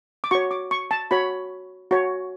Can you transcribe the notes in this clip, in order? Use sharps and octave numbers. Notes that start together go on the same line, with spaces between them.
D6
F#4 C#5 C#6
D6
C#6
A5
F#4 C#5 B5
F#4 C#5